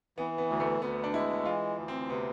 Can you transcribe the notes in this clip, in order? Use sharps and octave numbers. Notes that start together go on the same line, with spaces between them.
E3 B3
B3
D2
A3
D2 B3
D4
G#3 E4
E3 F4
D2
C4
C3 B3